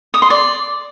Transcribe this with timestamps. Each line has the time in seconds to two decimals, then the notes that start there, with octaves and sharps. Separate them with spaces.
0.14 D#6
0.22 C6
0.30 D5